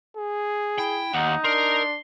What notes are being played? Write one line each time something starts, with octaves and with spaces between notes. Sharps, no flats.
G#4
E4 G5
D#2 D#4 F#5
D4 A#4 C6